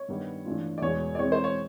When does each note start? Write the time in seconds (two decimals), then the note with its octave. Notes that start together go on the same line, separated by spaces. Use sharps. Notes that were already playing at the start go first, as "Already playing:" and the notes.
Already playing: C#5
0.08 G2 D#3 G3 B3
0.45 G2 E3 A3 D4 F4
0.78 D5
0.82 E2 B2 G#3 C#5
1.15 D5
1.19 E3 G#3 C4 C#5
1.32 C5
1.44 C#5